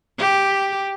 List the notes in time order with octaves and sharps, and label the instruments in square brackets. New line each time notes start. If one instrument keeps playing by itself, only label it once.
[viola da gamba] G4